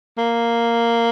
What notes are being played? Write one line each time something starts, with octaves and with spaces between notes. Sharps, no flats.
A#3